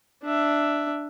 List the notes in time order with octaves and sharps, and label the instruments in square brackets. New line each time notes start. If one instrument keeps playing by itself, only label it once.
[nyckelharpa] D4 E5